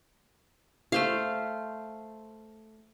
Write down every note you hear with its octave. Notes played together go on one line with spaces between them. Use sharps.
A3 C5 F5